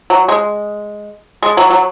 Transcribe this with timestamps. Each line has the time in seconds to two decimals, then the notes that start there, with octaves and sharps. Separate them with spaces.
0.10 F#3
0.29 G#3
1.43 G#3
1.57 F#3
1.70 F#3